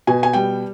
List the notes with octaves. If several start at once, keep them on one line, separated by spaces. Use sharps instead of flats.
B2 G#5
G#5
G3 G5